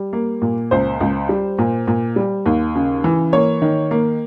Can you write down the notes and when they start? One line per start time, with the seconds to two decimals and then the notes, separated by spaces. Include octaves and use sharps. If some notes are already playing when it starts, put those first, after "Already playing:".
Already playing: G3
0.13 A#3
0.42 A#2
0.71 C#2 C5
1.00 C#2
1.29 G3
1.59 A#2
1.88 A#2
2.16 G3
2.46 D#2
2.75 C#3
3.04 E3
3.33 A#3 C#5
3.62 D#3
3.91 A#3